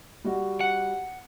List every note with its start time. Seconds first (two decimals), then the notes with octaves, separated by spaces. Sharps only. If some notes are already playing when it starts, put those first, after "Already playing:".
0.25 G3 F#4
0.61 F#5